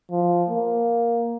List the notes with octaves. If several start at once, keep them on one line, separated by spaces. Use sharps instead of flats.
F3
A#3